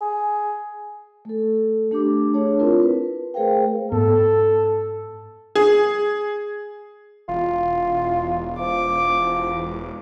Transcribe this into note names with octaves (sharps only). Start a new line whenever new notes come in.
G#4
A3 A4
A3 D4 G4 D6
D4 G#4 C#5 A5
C4 E4 F4 A#4
B4
A3 G#4 A#4 C5 F5 G5
G#2 B3 A4
G#4
E1 F4
F3 D6